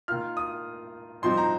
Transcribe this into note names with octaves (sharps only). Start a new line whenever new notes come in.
D#3 A#3 F4 F6
D#6
G2 F3 C4 D#4 C6
A#5